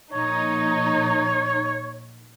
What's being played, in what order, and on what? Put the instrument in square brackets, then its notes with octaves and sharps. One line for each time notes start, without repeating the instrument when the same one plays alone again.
[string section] A#1 D#4 [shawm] C#5